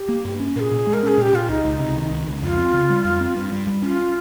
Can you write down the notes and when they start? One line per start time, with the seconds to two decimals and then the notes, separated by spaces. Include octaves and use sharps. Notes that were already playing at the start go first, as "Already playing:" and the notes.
Already playing: G4
0.09 A#3
0.25 G2
0.40 C#4
0.55 A#2 G#4 A#4
0.72 A#2
0.87 G#3
0.93 A#4
1.03 C#4 G#4
1.18 A#2 G4
1.34 A#2 F4
1.49 C#2 D#4
1.64 C#2
1.80 C3
1.96 D#3
2.11 C#2
2.27 C#2
2.42 F2 F4
2.58 C4
2.73 C#3
2.90 G3
3.05 F2
3.20 C4
3.36 G2
3.52 G2
3.67 G3
3.83 C#4 F4